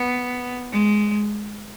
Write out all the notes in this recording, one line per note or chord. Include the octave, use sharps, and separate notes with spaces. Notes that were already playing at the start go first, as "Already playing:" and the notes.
Already playing: B3
G#3